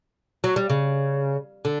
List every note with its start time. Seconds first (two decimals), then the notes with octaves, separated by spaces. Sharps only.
0.44 F#3
0.56 G3
0.70 C#3
1.65 D3